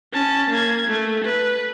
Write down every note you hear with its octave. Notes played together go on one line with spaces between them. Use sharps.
C#4 A5
A#3 G#6
A3
B4